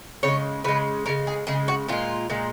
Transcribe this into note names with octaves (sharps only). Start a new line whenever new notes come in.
C#3 G#3 C#5
C#3 G#3 B4
C#3 G#3 A#4
G#4
C#3 G#3 G#4
F#4
A#2 G#3 F4
A#2 G#3